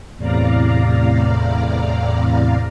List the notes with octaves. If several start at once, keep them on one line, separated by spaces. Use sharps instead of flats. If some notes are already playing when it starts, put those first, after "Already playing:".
E2 A2 C3 D5 F5 A#5